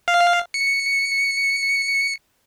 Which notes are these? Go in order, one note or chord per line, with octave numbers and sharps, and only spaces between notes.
F5
C#7